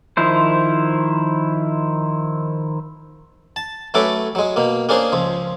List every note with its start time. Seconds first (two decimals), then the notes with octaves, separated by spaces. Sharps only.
0.17 D#3 F3 E4 C5
3.56 A5
3.94 F#3 A3 C#4 A4 B4 D6
4.35 F#3 G#3
4.56 B2 A#3
4.89 A#3 C#4 D4 G#4 C5
5.12 C#2 F3